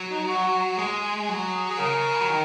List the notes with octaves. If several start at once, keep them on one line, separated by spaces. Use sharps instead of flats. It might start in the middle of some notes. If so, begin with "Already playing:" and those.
Already playing: F#3
D#4
F#4
F#4
G#3 G#4
G#4
F#3
G#4
C#3 A#4
F#3
D#3